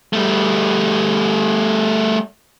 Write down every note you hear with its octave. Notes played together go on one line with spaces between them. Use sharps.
G3 A3